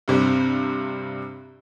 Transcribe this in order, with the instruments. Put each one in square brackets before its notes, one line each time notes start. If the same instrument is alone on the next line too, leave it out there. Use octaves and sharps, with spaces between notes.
[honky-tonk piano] G2 C3 G3